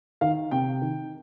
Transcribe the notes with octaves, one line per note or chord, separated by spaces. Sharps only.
D#3 F5
C3 G5
D#3